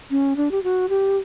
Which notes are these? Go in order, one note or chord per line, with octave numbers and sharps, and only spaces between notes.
C#4
D4
G4
F#4
G4